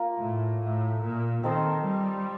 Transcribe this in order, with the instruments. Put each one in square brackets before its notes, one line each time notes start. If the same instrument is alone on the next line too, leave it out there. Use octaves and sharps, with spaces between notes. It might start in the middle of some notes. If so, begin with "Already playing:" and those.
Already playing: [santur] A#3 F4 A#4
[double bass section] A2
A2
A#2
[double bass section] D#3 [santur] C4 D#4 A4 C5
[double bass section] G3